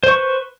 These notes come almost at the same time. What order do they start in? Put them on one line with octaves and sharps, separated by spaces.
C5 C#6 B4